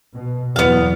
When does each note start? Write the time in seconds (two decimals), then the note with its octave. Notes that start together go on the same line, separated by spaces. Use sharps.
0.14 B2
0.56 E2 F#3 B3 F5